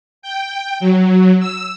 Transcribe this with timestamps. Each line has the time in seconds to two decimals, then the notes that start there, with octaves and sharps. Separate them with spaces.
0.22 G5
0.80 F#3
1.40 E6